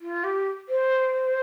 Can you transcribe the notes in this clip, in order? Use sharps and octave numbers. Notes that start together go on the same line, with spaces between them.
F4
G4
C5